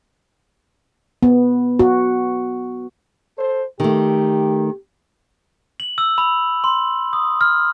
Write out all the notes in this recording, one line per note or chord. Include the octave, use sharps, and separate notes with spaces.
B3
F#4
A4 C5
D#3 A3 G4
F#7
E6
B5
C6
D#6
F6